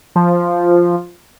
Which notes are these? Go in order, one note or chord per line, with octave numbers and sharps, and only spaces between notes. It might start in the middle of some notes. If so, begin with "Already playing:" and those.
F3